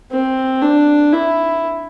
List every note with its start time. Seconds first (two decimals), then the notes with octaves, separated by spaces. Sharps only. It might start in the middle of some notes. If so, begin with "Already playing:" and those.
0.11 C4
0.61 D4
1.13 E4